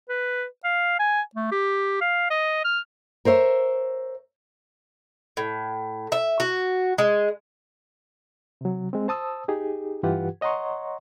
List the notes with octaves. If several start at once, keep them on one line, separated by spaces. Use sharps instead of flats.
B4
F5
G#5
A3
G4
F5
D#5
F6
A#4 C5 C#5 E5
A2
E5
F#4
G#3
C3 F#3
G#3 C4
C5 A5 D#6 E6
D#4 G4 G#4
G2 E3 F4 G4 B4 F#5
C#5 D#5 F#5 A#5 C6 C#6